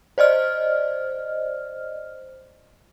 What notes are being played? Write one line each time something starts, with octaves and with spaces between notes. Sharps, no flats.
C5 D5 D#5 F6